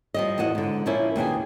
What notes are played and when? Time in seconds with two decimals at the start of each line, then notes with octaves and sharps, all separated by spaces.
0.14 F3 G3 D#5
0.38 E2 A2 F#4 D#5 F#5
0.55 G#2 D3
0.86 A#2 F3 A#3 C#4 E4
1.16 D#2 B2 D4 G#4